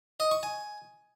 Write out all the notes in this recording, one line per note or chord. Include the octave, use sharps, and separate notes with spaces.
D#5
C#6
G#5